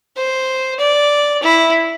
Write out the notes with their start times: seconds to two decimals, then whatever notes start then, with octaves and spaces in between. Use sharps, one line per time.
0.17 C5
0.79 D5
1.43 E4